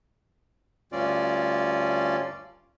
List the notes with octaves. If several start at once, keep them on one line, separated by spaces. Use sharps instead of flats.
D2 G2 C#4 F4 D5